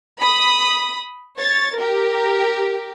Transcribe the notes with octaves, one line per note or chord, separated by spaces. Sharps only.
B5 D#6
C#5 A6
G4 A#4